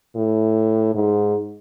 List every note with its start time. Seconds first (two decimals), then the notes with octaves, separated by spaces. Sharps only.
0.15 A2
0.95 G#2